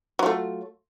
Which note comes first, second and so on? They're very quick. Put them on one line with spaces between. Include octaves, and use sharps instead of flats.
F#3 F4 A3